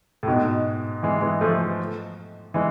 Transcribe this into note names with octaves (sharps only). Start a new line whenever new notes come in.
A2
G#2 B2
E3 G#3
E3 G#3
F3 A3
E3 G#3